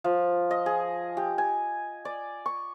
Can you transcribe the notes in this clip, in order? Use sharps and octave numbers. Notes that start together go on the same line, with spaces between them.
F3
D#5
G#4
G4
G#5
D5
C#6